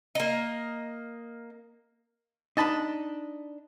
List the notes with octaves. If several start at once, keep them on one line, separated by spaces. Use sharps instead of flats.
A#3 D#5
D4 D#4 D#5 A5 B5